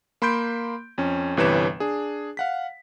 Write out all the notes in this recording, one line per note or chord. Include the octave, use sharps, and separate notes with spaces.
A#3 B5 C6 G6 D7
F2 C#4
G1 C3 E3 B4 C#5 E7
D4 G#4
F5 F#5 B6